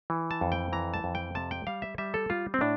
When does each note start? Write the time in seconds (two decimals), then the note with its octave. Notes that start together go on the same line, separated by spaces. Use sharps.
0.10 E3
0.31 A5
0.41 F2
0.52 G5
0.73 E3 A#5
0.94 A5
1.04 F2
1.15 G5
1.35 C3 A5
1.51 G5
1.67 G3 F5
1.82 E5
1.98 G3 E5
2.14 A4
2.30 G3 F4
2.54 C4
2.61 A2 D4